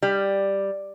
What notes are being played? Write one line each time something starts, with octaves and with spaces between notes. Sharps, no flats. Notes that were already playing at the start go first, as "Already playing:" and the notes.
G3